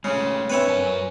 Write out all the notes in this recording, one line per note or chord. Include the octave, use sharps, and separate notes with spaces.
C#3 G#3 A3 C#4
C4 D4 B4 C#5 E5
F#2 A#4 G#5